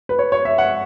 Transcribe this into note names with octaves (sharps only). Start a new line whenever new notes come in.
B4
C#5
C#5
E5
F#5